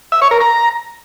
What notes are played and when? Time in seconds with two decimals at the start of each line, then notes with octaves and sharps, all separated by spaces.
0.12 E5
0.22 C#5
0.31 A#4
0.41 A#5